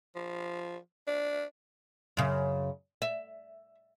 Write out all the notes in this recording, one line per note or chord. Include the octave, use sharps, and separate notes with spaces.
F3
D4
F#2 C#3
E5